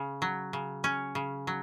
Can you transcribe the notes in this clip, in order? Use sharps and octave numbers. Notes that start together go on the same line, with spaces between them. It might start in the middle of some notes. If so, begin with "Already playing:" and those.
Already playing: C#3
F#3
C#3
C#4
C#3
F#3